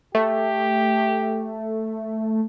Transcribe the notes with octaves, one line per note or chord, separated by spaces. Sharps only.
A3 G4